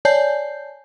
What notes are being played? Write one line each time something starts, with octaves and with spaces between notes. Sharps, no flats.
C#5 D5 G#5 A5 G6 C7